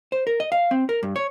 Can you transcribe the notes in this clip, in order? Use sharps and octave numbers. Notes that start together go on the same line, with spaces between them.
C5
A#4
D#5
F5
C4
A#4
G2
C#5